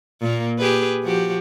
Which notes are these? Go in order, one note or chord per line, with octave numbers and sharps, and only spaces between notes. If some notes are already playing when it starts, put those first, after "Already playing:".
A#2 A#3
G4 G#4 B4
F3 F#4 G4